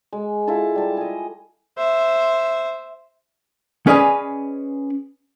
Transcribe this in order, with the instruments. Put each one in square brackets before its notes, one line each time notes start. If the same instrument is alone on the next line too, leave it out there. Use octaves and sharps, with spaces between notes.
[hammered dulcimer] G#3
E4 F4 A4 A5
G3 A5
G#4 D#5
[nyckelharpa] C5 E5
[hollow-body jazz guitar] C#4 G#4 B4 D5 D#5 G#5